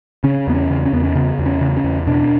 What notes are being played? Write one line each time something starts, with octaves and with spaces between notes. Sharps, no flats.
C#3 C#4
E2 B3
C#4
C#3
C#4
E2 B3
C#4
C#3 B3
E2
C#4
C#3
C#4
E2
B2 D4